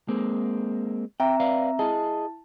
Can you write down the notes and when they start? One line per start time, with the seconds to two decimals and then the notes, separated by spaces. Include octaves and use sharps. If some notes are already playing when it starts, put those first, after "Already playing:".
0.08 G#3 A#3 C4
1.20 C4 E5 G5 A#5
1.40 B4 D5 F5
1.79 E4 G#4 D#5 A5